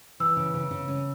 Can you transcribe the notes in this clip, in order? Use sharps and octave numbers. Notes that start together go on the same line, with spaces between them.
E3 E6
C#3
C#3
C#3
C#4